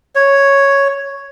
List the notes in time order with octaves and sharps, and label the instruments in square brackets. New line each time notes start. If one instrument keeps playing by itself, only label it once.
[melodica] C#5